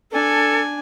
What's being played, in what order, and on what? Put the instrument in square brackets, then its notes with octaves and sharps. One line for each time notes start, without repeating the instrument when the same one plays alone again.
[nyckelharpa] D4 G#5 [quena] A4